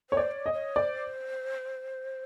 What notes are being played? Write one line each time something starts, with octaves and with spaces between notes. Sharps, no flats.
C5 C#5
D5
C#5
D#5
C#5
C5 D5